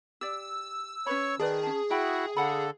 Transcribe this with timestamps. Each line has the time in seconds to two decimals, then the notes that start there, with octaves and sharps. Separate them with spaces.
0.21 G4 D5 E6
1.06 C#4 B4 C#5 B5
1.39 D#3 G#4 B4 D5 A5
1.63 C#4 A5
1.90 E4 F#4 E5 G5 B5
2.37 D3 A4 F5 F#5 B5